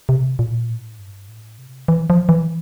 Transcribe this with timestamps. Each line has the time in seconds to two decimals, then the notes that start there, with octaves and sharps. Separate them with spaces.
0.09 C3
0.39 A#2
0.69 A2
0.99 G2
1.29 A2
1.58 C3
1.88 E3
2.10 F3
2.29 E3